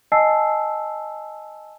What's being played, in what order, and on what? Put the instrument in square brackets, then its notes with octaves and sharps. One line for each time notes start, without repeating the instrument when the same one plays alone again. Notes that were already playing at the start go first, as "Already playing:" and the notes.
[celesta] D#5 G#5 A5 E6 C7